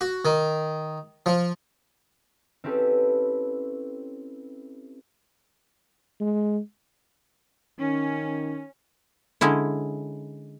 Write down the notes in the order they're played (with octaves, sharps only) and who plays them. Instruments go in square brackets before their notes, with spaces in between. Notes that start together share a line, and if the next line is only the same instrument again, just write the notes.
[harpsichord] F#4
D#3
F3
[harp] C4 C#4 E4 G4 A4 B4
[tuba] G#3
[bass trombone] D#3 [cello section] C#4
[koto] D3 G#3 C#4 E4